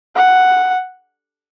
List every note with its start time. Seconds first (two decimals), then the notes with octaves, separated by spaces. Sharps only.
0.16 F#5